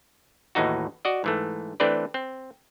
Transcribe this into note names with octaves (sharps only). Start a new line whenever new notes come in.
D#2 A2 E3 D#4 F#4
F#4 D5 D#5
G#2 E3 A3
E3 A3 C4 D4 B4 D5
C4